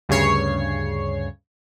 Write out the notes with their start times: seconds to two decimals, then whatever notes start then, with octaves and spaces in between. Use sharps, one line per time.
0.09 D2 G2 C#3 C#5 C7